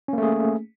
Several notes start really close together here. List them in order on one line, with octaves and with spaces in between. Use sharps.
C#4 A#3 A3 G#4